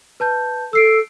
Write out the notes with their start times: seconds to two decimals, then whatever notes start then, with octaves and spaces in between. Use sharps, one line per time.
0.20 B4 A5 G6
0.73 A4 E6 C7 D7